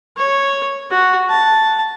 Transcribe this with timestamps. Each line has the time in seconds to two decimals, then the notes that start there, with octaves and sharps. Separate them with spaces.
0.18 C#5
0.91 F#4
1.30 A5